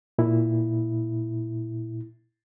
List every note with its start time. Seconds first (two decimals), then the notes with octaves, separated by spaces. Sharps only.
0.18 A#2 E4